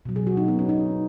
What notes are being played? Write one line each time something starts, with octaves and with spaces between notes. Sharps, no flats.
B2 F#3
G#4
F#4
D#4
B3
C#4
D#4